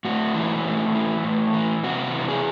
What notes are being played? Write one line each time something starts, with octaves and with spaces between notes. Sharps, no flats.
A2 F#4
E3
A2
E3
A2
E3
C3 F#4
E3
G#4